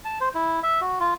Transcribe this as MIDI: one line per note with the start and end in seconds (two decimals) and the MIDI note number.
0.05 0.19 81
0.21 0.29 72
0.34 0.60 64
0.63 0.81 76
0.81 0.99 66
1.00 1.14 65